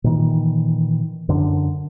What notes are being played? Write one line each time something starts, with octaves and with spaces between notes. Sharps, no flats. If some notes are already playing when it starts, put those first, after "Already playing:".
A#2 D#3 E3
F#2 D3